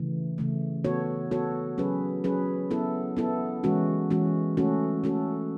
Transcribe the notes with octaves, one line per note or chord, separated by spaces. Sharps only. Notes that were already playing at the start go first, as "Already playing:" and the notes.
Already playing: C#3 E3 A3
C#3 E3 A3
B3 F#4 A4 C#5
B3 F#4 A4 C#5
F#3 C#4 G#4 B4
F#3 C#4 G#4 B4
B3 E4 A4
B3 E4 A4
E3 G#3 C#4 F#4
E3 G#3 C#4 F#4
A3 C#4 F#4 A4
A3 C#4 F#4 A4